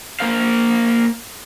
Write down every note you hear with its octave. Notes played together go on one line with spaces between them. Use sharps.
A#3 C5 F5